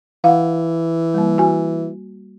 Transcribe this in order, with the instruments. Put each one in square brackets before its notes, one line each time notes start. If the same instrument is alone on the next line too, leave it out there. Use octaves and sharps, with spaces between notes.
[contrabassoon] E3 [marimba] F5 F#5
[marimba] G3 A#3
F#4 G#5